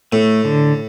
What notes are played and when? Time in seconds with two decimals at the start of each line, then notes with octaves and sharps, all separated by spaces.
0.12 A2 A3
0.45 D3